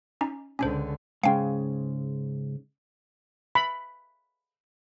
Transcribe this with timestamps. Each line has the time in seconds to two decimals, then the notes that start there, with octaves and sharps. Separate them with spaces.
0.21 C#4 D#4
0.59 C#2 D3 C#4 D4 C5
1.23 G#2 C#3 G#3 F5 G5
3.55 B5